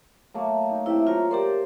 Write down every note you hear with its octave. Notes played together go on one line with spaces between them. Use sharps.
F#3 A3 A#3
D#4
C3 E4 E5 G5
F#3 F4 A#5 C#6
G4 A#4 C5 D5 G5